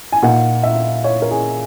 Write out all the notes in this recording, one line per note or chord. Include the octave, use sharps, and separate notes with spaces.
G#5
A#2 A#3 D#4 F#5
E5
C#5
A#4
G#4